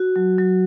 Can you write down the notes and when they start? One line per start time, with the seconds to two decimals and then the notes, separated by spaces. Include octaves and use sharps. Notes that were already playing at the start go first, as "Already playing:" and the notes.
Already playing: F#4
0.16 F#3
0.38 F#3